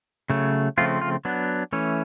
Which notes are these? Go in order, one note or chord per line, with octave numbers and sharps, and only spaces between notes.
C#3 F#3 A3
C#3 F3 A3 C4 F4
F4
F#3 B3 D4
E3 A3 C#4